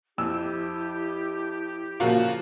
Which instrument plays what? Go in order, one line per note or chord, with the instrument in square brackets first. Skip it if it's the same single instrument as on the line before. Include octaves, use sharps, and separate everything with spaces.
[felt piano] F2 [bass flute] E4 [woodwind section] G4 [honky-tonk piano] E6
[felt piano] A#2 C#3 F3 [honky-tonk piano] A#3 F4 F#4